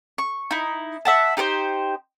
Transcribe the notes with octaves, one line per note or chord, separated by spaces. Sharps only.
C#6
D#4 E4
E5 F#5 A5
D#4 G4 B4 C5